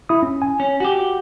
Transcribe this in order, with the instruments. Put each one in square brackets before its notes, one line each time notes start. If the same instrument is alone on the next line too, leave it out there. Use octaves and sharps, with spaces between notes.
[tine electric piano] E4 D#6
C#4
G#5
[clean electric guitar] C#4
F#4 G4